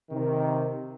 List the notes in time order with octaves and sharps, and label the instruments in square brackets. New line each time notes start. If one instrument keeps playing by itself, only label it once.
[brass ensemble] C3 D#3